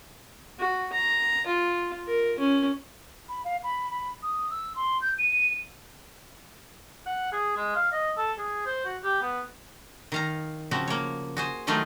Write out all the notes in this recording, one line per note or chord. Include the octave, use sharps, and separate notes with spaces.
F#4
A#5
F4
A#4
C#4
B5
F5
B5
B5
D#6
E6
C6
G6
D#7
F#5
G#4
G#3
F5
D#5
A4
G#4
C5
F#4
G4
B3
D#3 F5 A#5
C#3 F3 C4 F#4
A#3 C#5
F#4 G#4 C5
D#3 F#3 A3 D#4 F4